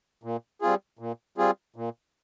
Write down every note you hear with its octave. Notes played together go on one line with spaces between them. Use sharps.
A#2
G3 C4 F4 G#4
A#2
G3 C4 F4 G#4
A#2